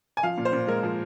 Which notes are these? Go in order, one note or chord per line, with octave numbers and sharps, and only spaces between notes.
G#5
F3 F5
A#2
C5
A#2
G#3 A#4
F3